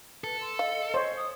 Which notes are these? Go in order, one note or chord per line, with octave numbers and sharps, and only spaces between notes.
A4 B4
C6
D#5 F5
C5 C#5
D#6